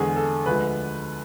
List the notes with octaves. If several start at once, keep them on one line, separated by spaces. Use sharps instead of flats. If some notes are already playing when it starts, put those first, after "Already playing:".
Already playing: E2 D3 G#3 G#4
A4
D2 D3 F3 G#3 B4